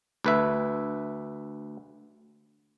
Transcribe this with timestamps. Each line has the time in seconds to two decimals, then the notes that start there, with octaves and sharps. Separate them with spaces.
0.24 D2 B4 E5